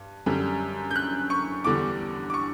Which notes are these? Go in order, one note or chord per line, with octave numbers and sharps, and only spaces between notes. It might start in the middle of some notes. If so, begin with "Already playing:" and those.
Already playing: G2
F#2 D3 G3
G6
F#6
C#6
E2 D3 G3 D6
D6
C#6